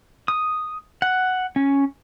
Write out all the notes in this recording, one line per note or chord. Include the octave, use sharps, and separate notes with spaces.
D#6
F#5
C#4